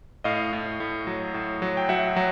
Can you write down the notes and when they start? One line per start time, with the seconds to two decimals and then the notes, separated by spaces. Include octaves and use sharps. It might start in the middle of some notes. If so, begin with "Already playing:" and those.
0.24 A2 D#5 F5
0.53 A2
0.80 A2
1.07 F#3
1.34 A2
1.62 F#3
1.77 G5
1.89 F#3 E5 F#5
2.16 F#3